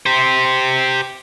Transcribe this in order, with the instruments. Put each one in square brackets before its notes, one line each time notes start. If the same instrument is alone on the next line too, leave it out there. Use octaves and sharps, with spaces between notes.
[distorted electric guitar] G4 C5